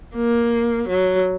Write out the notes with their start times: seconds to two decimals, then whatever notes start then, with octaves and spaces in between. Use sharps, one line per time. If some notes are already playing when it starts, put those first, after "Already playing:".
0.16 A#3
0.88 F#3